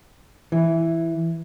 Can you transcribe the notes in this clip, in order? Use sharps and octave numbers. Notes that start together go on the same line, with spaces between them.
E3